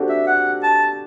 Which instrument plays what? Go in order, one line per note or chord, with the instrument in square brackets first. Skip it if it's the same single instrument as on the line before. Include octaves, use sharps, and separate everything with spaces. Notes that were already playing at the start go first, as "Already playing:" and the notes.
Already playing: [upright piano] C4 D4 F#4 G4 A4
[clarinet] E5
F#5
A5